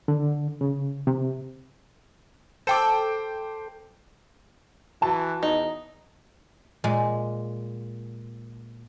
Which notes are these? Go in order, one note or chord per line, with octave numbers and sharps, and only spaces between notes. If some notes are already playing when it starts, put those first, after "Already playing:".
D3
C#3
C3
A4 C5 G5 D6
E3 F#4 A5
E2 D#4
A#2 G#3